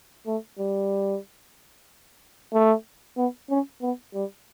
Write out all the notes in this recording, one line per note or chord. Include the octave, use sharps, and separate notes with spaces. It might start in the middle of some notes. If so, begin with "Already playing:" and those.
A3
G3
A3
B3
C#4
B3
G3